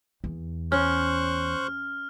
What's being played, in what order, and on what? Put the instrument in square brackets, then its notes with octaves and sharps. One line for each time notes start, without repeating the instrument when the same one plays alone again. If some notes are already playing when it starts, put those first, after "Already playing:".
[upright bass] E2
[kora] C#4 [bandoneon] C5 C#6 F#6 [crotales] F6